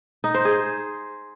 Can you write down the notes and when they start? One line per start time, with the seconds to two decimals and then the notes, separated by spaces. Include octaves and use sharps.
0.24 D#4
0.34 C5
0.45 G#4